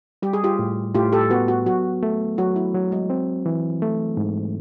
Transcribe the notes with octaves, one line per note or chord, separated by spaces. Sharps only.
G3 G4
G#4
F4 G4
A2
A2 F4 G4
G4 A4
B3 F#4
F#4
F#3 F#4
A3
F#3 F#4
E4
F#3
G#3
C4
E3
A3
G#2